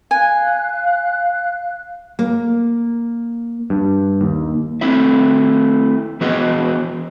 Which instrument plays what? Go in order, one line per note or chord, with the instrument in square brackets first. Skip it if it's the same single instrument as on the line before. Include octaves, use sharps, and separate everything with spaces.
[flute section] F5 F#6 [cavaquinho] G#5
[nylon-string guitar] A#3
[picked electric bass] G2
D#2
[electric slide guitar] A3 C4 E4 E5
E3 B3 F#4 G#4 D#5